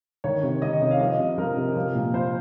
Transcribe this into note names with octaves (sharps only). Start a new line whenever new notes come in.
D#3 C#5
C3
D#3 D#5
C3
F5
F3 D#5
C3
F3 A#4
C3
F3
A#2
F3 C5